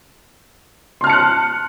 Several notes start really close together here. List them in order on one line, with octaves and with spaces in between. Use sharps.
C6 F6 A5 C#7 F#6